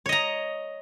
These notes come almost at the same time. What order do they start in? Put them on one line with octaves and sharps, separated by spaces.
C#5 D#5 A#5